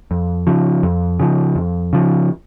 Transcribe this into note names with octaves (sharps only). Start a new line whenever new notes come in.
F2
C#3 F3
F2
C#3 F3
F2
C#3 F3